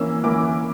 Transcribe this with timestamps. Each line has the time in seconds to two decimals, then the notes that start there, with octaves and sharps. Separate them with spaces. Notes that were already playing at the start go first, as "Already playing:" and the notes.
Already playing: E3 A#3 C#4 E6
0.24 E3 A#3 C#4 D6